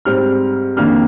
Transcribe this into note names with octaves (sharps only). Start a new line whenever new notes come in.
G#2 G3 C4 F6
F2 D#3 A#3 D4 F6